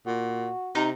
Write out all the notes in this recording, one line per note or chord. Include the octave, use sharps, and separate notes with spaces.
A#2 F#4
C3 D#4